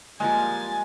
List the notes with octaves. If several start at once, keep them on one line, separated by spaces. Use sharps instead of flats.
F3 G3 G#3 A#3 G#5 A6